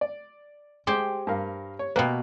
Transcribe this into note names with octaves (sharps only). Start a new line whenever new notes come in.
D5
G#3 G4 C5 G5
G2 A#4 F5
C#5
B2 A#3 B4 G5 B5